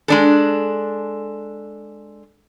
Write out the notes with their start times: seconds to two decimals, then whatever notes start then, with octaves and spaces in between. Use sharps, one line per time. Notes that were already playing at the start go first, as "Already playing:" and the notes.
0.08 G#3 D4 A4